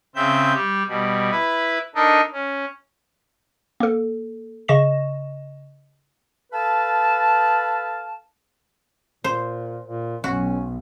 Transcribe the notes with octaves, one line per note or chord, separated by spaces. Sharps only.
C#3 C4 E5 G6
G3 G4
B2 G3
E4 B4
D4 D#4 A4 A#4 D#5
C#4
A#3 A4
C#3 D#5 C#6 A#6 E7
A4 B4 F5 A5
A#2 C5
A#2
B1 C#4 F#4